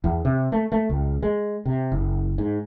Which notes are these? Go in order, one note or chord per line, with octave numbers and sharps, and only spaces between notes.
E2
C3
A3
A3
C#2
G#3
C3
F#1
G#2